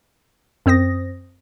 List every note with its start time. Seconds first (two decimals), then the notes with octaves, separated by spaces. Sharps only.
0.66 F#2 C4 C5 D#6 A#6